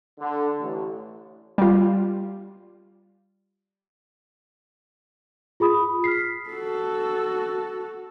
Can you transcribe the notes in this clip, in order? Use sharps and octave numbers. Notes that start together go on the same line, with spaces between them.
D3
A1
G3 F4
F4 G#4 B5 D#6
F6 B6 C7
F#4 A4